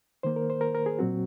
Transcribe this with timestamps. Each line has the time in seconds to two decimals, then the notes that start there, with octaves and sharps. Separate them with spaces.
0.23 D#3 A#3 C5
0.36 A#4
0.50 C5
0.61 A#4
0.75 A#4
0.86 G#4
0.99 A#2 F#3 C4 F#4